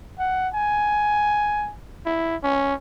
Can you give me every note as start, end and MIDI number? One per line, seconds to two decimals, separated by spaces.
0.19 0.49 78
0.54 1.71 80
2.06 2.36 64
2.43 2.74 61